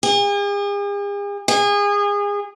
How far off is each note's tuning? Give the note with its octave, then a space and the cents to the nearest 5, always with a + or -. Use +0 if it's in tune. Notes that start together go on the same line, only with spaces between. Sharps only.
G#4 -45
G#4 -30